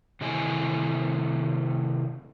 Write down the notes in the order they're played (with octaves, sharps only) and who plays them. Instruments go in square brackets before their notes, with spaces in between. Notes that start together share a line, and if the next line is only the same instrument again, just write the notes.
[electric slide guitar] C3 D#3 A3 E4 D#5 G#5